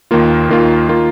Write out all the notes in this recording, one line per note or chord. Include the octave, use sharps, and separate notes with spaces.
D#2 D#3 A#3 F4
D#2 D#3 A#3 F4
D#3 A#3 F4